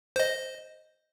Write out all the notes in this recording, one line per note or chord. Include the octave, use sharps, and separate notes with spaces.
C5 D#5